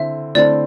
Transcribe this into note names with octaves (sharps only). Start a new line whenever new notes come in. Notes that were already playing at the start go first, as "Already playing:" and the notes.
Already playing: D3 C4 E4 E5
D3 A3 C4 E4 D5